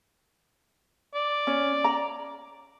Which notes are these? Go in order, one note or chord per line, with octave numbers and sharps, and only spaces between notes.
D5
C#4
A#5